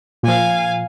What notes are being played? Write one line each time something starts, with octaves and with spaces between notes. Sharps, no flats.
A#2 F3 F5 G#5